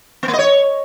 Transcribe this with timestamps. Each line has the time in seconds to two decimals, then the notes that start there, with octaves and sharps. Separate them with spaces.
0.23 B3
0.28 A#3
0.33 D#5
0.39 C#5